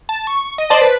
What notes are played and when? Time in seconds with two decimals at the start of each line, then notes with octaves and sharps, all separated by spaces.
0.09 A5
0.27 C#6
0.58 D#5
0.70 C5 D5 A5
0.81 B4